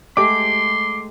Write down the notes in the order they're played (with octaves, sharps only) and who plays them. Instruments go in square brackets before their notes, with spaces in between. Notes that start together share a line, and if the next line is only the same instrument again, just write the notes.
[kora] G#3 A3 G4 [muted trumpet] C6 [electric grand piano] D6